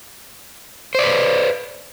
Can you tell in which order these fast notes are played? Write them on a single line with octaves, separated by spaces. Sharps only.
C5 D5 B4